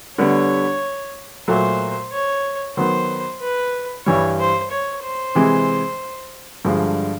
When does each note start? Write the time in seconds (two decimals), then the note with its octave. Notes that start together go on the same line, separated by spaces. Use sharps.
0.18 D3 G3 B3 C#5
1.48 A#2 F#3 A3 C5
2.12 C#5
2.77 D#3 F#3 B3 C5
3.41 B4
4.06 G2 E3 G3 C#5
4.39 C5
4.71 C#5
5.03 C5
5.35 C3 E3 G#3
6.65 G2 D3 F3 G#3